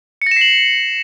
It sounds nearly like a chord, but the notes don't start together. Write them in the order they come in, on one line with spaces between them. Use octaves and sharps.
C#7 A#6 E7 C7 F#7